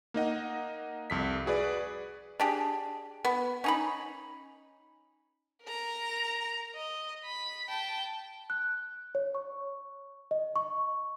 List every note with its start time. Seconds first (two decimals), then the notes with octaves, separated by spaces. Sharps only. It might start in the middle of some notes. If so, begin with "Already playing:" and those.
0.14 A#3 D#4 D#5 F#5
1.10 C2 F2 B6
1.46 F#4 G#4 B4 D5
2.40 D4 G4 G#4
3.25 B3
3.64 C#4 D#4 B5
5.63 A#4 A#5
6.75 D#5
7.25 B5
7.69 G5 A5
8.50 F#6
9.15 C#5
9.35 C#6
10.31 D#5
10.56 C#6